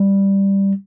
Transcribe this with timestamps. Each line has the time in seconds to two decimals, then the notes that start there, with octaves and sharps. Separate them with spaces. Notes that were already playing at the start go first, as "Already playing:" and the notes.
Already playing: G3